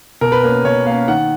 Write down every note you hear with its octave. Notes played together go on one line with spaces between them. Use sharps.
B2 A#4
B4
A#3 C#4 A#4
B2 C#5
A#3 C#4 F5
D#3 F#5